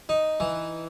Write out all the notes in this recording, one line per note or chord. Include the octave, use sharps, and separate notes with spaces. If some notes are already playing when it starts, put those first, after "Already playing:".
D#4
E3